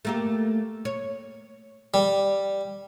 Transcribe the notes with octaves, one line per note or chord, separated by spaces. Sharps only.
A3 A#3 G4
C#5
G3